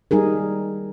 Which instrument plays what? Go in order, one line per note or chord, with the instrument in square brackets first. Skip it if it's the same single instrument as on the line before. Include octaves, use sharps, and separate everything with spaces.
[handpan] G3 D#4 G#4 A#4